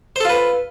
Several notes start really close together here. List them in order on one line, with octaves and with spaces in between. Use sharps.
C5 A4 F4 B4